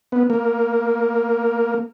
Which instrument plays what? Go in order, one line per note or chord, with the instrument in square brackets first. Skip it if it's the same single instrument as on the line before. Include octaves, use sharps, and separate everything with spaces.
[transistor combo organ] B3
A#3